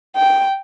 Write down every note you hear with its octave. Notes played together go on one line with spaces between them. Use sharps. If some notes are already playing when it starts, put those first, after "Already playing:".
G5